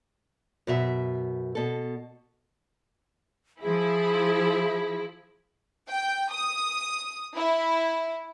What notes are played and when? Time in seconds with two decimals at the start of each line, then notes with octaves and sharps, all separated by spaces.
0.67 F#2 B2 E5
1.55 B2 A4
3.62 F3 E4 G#4
5.88 G5
6.31 D#6
7.36 E4